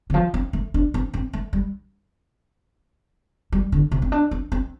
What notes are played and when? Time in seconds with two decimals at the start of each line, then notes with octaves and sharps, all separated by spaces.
0.10 D3
0.14 F3
0.34 C4
0.53 A3
0.74 D4
0.94 C4
1.14 C4
1.33 A3
1.53 G3
3.52 G3
3.72 D3
3.92 C3
4.02 C4
4.12 D4
4.31 C4
4.52 C4